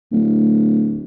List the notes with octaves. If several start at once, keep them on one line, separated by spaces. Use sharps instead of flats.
D1